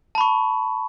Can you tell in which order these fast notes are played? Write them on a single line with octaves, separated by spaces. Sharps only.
A5 B5 C#6